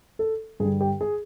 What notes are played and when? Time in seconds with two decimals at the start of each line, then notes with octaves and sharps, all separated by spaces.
0.19 A4
0.60 G2 D3 G3 G#4
0.81 G4
1.01 G#4